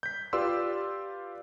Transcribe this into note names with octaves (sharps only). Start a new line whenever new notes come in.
G6 B6
F4 G4 B4 D5 C6 E6